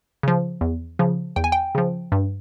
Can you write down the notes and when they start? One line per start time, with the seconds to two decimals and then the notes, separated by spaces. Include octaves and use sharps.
0.23 C#3 F3
0.61 E2
0.99 C#3 F3
1.36 E2 G5
1.44 G#5
1.52 G5
1.75 C#3 F3
2.12 G2